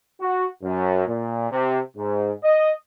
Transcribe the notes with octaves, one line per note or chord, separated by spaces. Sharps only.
F#4
F#2
A#2
C3
G#2
D#5